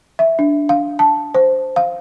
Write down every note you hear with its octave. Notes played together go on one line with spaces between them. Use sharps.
E5
D4
F5
A5
C5
F5